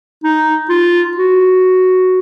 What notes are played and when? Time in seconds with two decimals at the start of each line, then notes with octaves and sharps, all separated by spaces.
0.24 D#4
0.70 F4
1.17 F#4